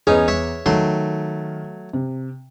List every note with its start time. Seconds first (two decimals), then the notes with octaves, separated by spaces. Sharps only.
0.07 E2 C#4 D#4 G#4 B4
0.28 C#5 E5 C#6
0.66 D#3 F#3 A3 C6
1.93 C3